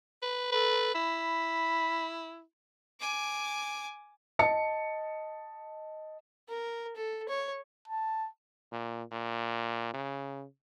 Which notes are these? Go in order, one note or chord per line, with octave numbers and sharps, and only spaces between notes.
B4
A4 B4
E4 B5
G#5 D6
D#5 A5 C#7
A#4
A4
C#5
A5
A#2
A#2
C#3